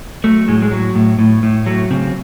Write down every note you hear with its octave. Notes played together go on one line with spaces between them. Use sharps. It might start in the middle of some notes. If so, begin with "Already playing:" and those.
F#3 A3
A2 G#3
G#3
F#3
A2
A2
A2
F#3 A3
C#3 C4